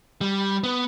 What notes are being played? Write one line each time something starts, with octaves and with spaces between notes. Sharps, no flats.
G3
B3